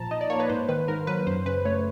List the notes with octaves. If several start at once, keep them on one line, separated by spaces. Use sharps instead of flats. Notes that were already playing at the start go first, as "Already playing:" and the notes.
Already playing: A#2 F3 A5 A#5
D#4 D#5
D5
A#3 C#5
B4
G#2 C5
D#3 B4
G#2 A#4
F#3 B4
F#2 C5
C#3 B4
A3 C#5